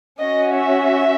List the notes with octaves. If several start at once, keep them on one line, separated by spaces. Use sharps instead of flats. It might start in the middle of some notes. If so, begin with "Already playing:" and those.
C#4 F#4 D#5
E5